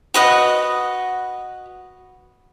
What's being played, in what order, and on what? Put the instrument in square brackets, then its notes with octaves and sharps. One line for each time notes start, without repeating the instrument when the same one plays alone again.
[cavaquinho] F#4 B4 D#5 F#5